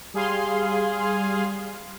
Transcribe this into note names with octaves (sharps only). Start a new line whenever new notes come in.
G3 G#4 F5 C6